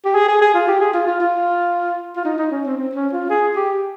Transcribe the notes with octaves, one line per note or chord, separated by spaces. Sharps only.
G4
G#4
G#4
G#4
F4
G4
G#4
F4
F4
F4
F4
D#4
D#4
C#4
C4
C4
C#4
F4
G#4
G4